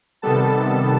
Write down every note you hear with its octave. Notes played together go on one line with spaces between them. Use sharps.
C3 D#3 G3 B3 A4 A5